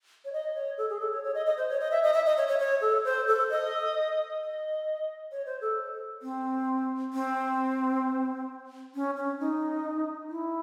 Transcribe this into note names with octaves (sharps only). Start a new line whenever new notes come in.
C#5
D#5
C#5
A4
G#4
A4
C#5
C#5
D#5
D#5
C5
C#5
D#5
E5
D#5
E5
D#5
C#5
C#5
C#5
A4
C5
A4
D#5
D#5
C#5
C5
A4
C4
C4
C#4
C#4
D#4
E4